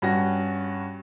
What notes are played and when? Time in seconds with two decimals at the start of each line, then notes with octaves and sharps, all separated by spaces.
0.02 G2 C#4 F#4 A#6